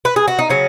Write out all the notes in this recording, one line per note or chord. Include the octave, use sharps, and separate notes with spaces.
B4
G#4
F#4
D#4
C#3 F#3 C#4